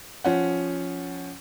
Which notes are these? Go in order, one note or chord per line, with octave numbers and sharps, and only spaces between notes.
F3 C#4 F#5